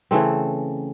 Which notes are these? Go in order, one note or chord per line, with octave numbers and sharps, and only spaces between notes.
C#3 E3 A3 C4